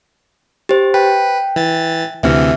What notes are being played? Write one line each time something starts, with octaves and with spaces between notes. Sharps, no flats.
G4 C5
B4 G5
E3 A6
D2 C3 E3 C4 E5